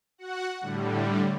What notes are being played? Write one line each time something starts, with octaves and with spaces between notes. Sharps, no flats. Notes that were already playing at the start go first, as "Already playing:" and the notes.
F#4 F#5
A2 D3 G3